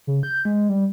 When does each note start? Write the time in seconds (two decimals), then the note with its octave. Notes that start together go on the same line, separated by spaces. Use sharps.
0.07 C#3
0.23 G6
0.45 G#3
0.69 G3